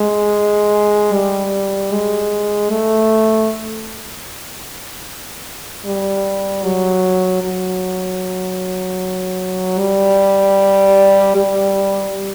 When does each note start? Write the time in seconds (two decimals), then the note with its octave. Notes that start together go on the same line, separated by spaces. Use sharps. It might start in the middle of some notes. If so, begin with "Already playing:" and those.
Already playing: G#3
1.13 G3
1.91 G#3
2.70 A3
5.85 G3
6.64 F#3
7.42 F#3
9.79 G3
11.36 G3